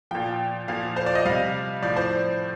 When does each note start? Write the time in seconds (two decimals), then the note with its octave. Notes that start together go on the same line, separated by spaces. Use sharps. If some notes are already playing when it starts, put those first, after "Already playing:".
0.11 A#2 F3 G5
0.68 A#2 F3 F5
0.96 C5
1.06 D5
1.15 D#5
1.25 C3 G3 F5
1.82 A2 F3 D5
1.96 C5